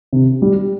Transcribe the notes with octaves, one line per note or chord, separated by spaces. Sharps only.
C3
G3